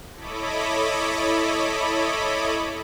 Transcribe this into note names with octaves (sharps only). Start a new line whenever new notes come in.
E4 A4 C#5 D#5 B5 D6